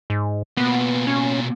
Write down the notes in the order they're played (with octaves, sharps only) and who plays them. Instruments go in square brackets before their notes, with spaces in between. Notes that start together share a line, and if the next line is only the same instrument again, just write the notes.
[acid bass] G#2
[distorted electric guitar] B2 A#3 [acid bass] B3
[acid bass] C#4